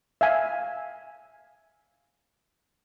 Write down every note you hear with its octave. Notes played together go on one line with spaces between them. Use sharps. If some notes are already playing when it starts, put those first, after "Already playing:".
E5 F5 G#5